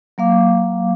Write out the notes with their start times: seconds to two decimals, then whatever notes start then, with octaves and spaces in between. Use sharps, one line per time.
0.18 F#3 A#3 F5 D6